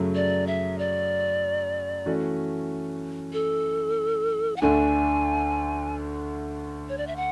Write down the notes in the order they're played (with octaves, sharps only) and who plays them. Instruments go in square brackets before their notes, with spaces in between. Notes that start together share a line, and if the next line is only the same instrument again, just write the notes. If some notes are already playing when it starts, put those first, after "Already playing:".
Already playing: [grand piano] F#2 C#3 F#3 A3
[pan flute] D5
E5
D5
[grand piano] E3 A3 C#4 F#4
[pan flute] A4
F#5
[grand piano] D2 D3 A3 D4 [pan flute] G#5
[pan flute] C#5
D5
E5
F#5